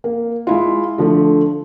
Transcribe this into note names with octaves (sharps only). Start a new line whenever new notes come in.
A#3
G#3 E4 F4
D3 F3 A3